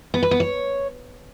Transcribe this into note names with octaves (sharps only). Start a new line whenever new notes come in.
B3
B4
B3
C#5